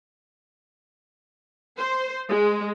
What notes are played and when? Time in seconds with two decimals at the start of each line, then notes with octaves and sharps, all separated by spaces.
1.78 C5
2.29 G#3